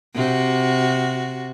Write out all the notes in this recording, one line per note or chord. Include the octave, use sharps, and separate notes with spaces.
C3 F#4